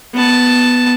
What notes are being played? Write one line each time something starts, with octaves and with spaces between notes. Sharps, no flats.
B3 A5